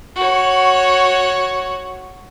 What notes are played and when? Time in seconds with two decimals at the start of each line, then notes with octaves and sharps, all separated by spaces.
0.16 F#4 C#5